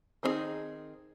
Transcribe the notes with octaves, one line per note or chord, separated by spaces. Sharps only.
D#3 C4 D4 D#4 G#4